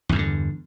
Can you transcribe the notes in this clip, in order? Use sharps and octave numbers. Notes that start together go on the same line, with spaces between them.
E2 G2 B2 D3